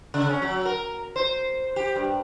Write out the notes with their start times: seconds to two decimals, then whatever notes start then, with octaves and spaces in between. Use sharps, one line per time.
0.14 C#3
0.29 C#4
0.42 F#3
0.65 A#4
1.16 C5
1.76 G4
1.96 G2